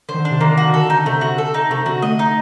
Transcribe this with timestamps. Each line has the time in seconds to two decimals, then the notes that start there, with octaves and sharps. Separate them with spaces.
0.09 D3 C5
0.14 D#3
0.19 D3
0.25 D4
0.31 C3
0.41 D#3 A#3
0.51 D#3
0.58 D3 F#4
0.68 D3
0.73 D#3 A4
0.89 D3 D#4
1.06 C3 A3
1.21 C3 F#4
1.38 A4
1.54 D#4
1.70 C3 A3
1.86 D3 F#4
2.02 A3 D#5
2.19 D#4